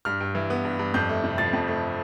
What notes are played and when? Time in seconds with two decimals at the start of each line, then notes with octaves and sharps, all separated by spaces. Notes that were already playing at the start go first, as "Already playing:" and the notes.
0.05 G2 F6
0.21 G2
0.35 E3
0.50 B3
0.65 G2
0.79 G2
0.94 F2 G6
1.09 A3
1.24 C3
1.38 F3 A6
1.53 F2
1.68 A3